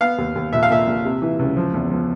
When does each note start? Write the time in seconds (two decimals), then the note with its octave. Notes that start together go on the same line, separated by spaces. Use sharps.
0.01 B3 F5
0.18 D#2
0.35 D#2
0.53 A#1 E5
0.63 F5
0.70 A#2 E5
0.87 A#1
1.05 C3
1.22 E3
1.39 C#2
1.57 F3
1.74 E2
1.91 F3